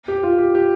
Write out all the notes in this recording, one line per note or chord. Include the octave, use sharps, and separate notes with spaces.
G4
F4
G4
G4